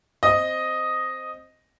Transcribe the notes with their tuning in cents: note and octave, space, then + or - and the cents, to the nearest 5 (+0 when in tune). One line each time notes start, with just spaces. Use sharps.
C4 +0 D#5 +0